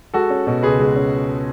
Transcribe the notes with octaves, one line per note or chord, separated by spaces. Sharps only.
G#3 F#4 A4
C#4
B2
C#2 G#4 B4
G#3
C#4